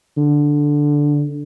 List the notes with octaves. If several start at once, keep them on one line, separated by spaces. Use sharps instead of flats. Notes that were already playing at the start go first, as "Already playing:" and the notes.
D3